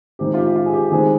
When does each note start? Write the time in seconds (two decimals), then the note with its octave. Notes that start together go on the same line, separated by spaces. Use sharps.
0.19 D#3 G#3 C4 G4
0.34 F4
0.37 G4
0.55 F4
0.66 G#4
0.73 G4
0.92 D#3 G#3 C4 G#4